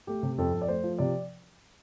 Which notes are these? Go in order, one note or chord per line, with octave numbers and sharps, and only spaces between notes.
A3 G4
C3
F2 A4
F2
D5
A3 C5
F3
C3 D5